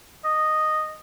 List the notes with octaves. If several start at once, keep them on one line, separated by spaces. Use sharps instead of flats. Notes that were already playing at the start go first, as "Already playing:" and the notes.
D#5